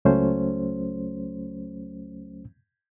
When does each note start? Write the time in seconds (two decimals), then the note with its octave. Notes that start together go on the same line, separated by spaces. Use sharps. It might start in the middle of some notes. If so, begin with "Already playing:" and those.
0.05 C#2 F#3 A3 C#4 C5